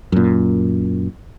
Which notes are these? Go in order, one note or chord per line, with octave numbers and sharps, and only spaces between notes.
F#2 A#2